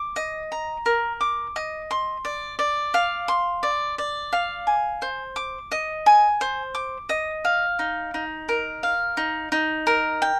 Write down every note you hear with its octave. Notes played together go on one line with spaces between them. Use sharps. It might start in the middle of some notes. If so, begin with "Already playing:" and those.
Already playing: D6
D#5
A#5
A#4
D6
D#5
C6
D5
D5
F5
C6
D5
D5
F5
G#5
C5
D6
D#5
G#5
C5
D6
D#5
F5
D#4
D#4
A#4
F5
D#4
D#4
A#4
G5